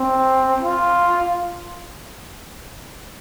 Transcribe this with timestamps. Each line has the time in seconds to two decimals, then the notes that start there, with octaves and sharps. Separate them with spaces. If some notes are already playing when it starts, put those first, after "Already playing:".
Already playing: C4
0.60 F4